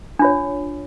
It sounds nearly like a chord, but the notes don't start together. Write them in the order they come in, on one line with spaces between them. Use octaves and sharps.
D4 F4 C#5